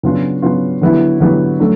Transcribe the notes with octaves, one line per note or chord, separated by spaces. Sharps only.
C#3 F#3 B3 D4 F4
C#3 F#3 B3 D4 F4
D3 F#3 B3 E4 G4
D3 F#3 B3 E4 G4
F#3 A3 D4